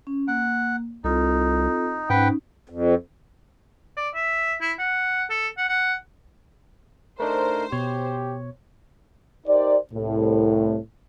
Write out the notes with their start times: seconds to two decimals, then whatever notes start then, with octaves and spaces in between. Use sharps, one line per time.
0.07 C#4
0.28 A#3 F#5
1.04 C2 C4 D#4 F4 A4
2.10 G#2 C#4 D#4 B4 F#5 G5
2.69 F2
3.97 D5
4.14 E5
4.61 E4
4.79 F#5
5.30 A4
5.58 F#5
5.69 F#5
7.20 A3 D4 D#4 A#4 C5
7.72 B2 G4 C#5
9.47 D#4 G4 A#4 C5 D5
9.93 C2 A2